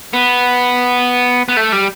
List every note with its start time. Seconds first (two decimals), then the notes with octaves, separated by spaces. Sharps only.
0.13 B3
1.49 B3
1.57 A3
1.72 G3